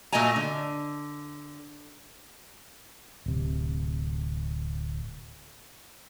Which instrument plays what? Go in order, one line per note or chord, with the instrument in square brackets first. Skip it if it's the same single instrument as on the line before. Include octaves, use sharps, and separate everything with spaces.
[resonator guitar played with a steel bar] A#2 A3 F#4 D#5 G#5 A#5
D3
[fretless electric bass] D1 C3